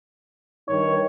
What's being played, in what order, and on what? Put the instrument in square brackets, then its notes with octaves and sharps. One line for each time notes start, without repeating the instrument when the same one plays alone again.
[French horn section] G2 D#3 D#4 [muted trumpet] C#5